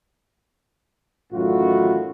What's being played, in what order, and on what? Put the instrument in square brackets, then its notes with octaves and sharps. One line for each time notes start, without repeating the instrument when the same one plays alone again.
[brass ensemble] A1 F#2 A2 D#3 F4 F#4